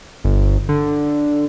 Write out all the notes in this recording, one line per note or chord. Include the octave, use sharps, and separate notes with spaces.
G1
D3